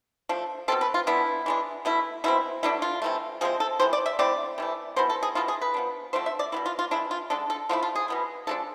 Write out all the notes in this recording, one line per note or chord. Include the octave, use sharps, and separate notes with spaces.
F3 A3 D4
B2 G#3 C4 A4
B4
F4
E3 B3 D4 E4
E3 G#3 D4
B2 A3 E4
B2 G#3 C4 E4
B2 A3 D4 E4
F4
C3 E3 A3
C3 F3 G#3 C4 G#4
A4
C3 E3 G#3 C5
D5
E5
D3 A3 C4 E4 D5
C3 E3 A3
B2 G#3 B3 E4 C5
A4
G#4
B2 A3 E4 F4
G#4
B4
F3 B3 D4
D3 F3 A3 C4 C5
E5
D5
B2 B3 E4 D5
F4
F4
E3 G#3 D4 E4
F4
D3 G#3 D4 A4
A4
D3 F3 A3 E4 F4
F4
G#4
B2 B3 E4
F3 G#3 D4 A4